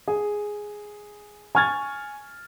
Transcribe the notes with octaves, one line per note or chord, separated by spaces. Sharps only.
G#4
G#5 C#6 F6 G#6 A6